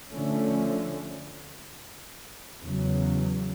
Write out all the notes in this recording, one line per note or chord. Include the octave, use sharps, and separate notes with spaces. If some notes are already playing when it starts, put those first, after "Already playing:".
D3 F3 A3 C#4
E2 C#3 F#3